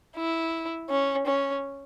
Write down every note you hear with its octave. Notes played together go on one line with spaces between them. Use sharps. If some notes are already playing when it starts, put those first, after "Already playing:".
E4
C#4
C#4